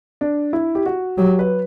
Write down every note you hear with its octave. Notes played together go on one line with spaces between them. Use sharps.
D4
E4
G4
F#4
F#3 G4
B4